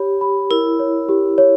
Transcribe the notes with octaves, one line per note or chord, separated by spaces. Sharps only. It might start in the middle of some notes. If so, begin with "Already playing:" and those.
Already playing: G4 C#5 B5
B5
E4 A#4
C#5
G4
C#5